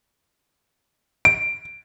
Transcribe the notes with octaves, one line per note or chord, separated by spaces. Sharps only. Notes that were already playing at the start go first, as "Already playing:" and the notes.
D7